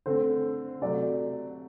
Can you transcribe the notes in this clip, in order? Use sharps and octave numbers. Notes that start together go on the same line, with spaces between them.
D3 A3 C4 C5
C3 F#3 A3 D5